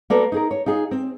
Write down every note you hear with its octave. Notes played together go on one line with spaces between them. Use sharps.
A#3 B3 F#4 A4 B4 D5
D#4 G#4 A#4
C#5
D#4 F4 G#4
C4